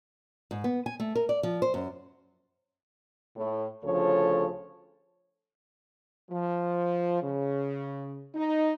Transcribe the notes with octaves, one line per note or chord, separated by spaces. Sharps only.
G#2
B3
G#5
A3
A#4
D5
F3
C5
F#2
A2
D2 C#3 F3 A4 C#5
F3
C#3
D#4